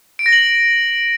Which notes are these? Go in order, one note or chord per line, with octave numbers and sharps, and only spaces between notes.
D7
A#6
F#7